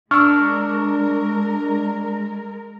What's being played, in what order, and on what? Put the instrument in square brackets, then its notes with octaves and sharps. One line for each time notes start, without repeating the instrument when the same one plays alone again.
[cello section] G#3 A#4 [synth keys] D4 [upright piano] C#6 E6 [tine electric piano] F6